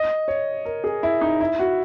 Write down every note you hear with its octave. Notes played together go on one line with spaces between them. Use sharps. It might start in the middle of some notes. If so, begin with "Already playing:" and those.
Already playing: D#5
C#5
A#4
G#4
E4
D#4
E4
F#4